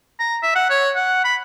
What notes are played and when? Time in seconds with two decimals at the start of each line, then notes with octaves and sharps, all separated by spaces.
0.19 A#5
0.43 E5
0.55 F#5
0.70 C#5
0.96 F#5
1.24 B5